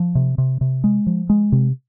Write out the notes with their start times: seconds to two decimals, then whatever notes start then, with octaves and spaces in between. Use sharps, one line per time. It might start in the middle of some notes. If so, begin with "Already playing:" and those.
Already playing: F3
0.15 C3
0.38 C3
0.61 C3
0.84 G#3
1.07 F3
1.30 G#3
1.52 C3